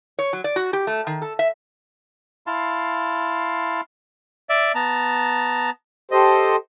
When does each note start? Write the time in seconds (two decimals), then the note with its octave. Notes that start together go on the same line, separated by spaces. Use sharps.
0.19 C#5
0.33 F#3
0.44 D5
0.56 F#4
0.73 G4
0.87 A3
1.07 D#3
1.22 A4
1.39 E5
2.47 E4 F5 A5 C6
4.49 D5 E5
4.75 B3 A5 A#5
6.11 G4 A4 C5 D#5